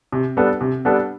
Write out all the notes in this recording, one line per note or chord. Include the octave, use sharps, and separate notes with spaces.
C3
G3 B3 D4 A4
C3
G3 B3 D4 A4